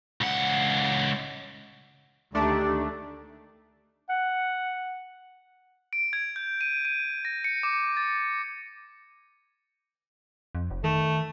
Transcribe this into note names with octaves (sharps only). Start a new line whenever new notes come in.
C#2 F#5
D2 D#3 A3 D4 G4 D5
F#5
D7
G#6
G6
D#7
D#7
A#6
C#7
D6
A6
F2
F1
D#3 A3